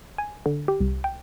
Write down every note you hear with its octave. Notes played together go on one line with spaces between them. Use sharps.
G#5
D3
G4
C2
G5